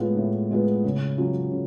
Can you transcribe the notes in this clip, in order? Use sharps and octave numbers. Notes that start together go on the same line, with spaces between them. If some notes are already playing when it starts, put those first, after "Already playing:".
Already playing: A2 G#3 B3 F4
A2
G#3 B3 F4
C#3
F#3 C#4 F4
C#3